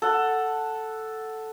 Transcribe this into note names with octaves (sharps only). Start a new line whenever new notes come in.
A4 F#5